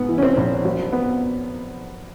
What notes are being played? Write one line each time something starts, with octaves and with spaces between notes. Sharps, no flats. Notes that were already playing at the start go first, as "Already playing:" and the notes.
Already playing: G#2 B3
E3
C#4
C4
A#1
F#3
B3